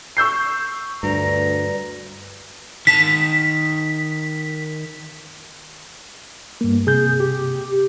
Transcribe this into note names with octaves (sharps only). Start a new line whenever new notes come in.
C#6 E6 G6 C7
D2 G2 B4 D5 A#5
D#3 A5 B6
G2 A#3
C3 G#4 G6
G4